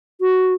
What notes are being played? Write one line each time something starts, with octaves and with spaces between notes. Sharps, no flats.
F#4